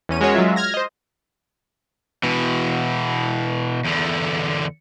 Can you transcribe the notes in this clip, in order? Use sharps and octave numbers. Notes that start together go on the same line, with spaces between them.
E2 C#4 D#7
G#3 C#4 F#4 A#4 C#5
F#3 G#3 F4 E5
F6 G#6 A#6
C5 D#5
B2 E3
E2 D3